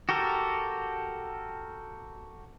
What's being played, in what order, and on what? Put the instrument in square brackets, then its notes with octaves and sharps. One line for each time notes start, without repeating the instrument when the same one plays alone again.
[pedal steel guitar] F#4 G4 A4 A#4